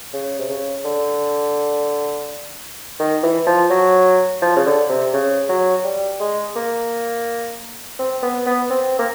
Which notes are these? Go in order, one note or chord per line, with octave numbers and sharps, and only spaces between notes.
C#3
C3
C#3
D3
D#3
E3
F3
F#3
F3
C#3
D3
C3
C#3
F#3
G3
G#3
A#3
C4
B3
B3
C4
A#3